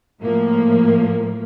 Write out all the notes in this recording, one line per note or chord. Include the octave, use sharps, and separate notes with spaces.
A2 F3 A#3